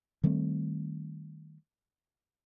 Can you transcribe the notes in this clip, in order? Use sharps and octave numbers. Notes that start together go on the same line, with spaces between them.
D#3 G3 A3 C4